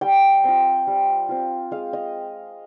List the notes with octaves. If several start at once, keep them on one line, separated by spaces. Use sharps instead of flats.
G3 G5
C4 F4
G3
C4 F4
G#3 F5
D#5